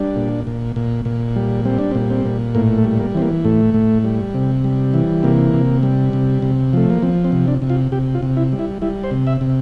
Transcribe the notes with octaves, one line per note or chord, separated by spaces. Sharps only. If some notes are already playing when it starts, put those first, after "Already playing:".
Already playing: G3 D4
A#2
A#2
A#2
A#2
G3
G3 C4
D4
C4
A#2
C4
A#2
A2 A#3
A3
G3
A#3
E3 C4
A#3
A2 A3
A2
G3
C3
G3
E3
C3 A#3
C3
G3
C3
C3
F3 A3
A#3
F3 C4
C4
C3
D4
C3
F4
C3 G4
F4
C3
E4
G3
E4
G3 E4
C5
C3
E5
C3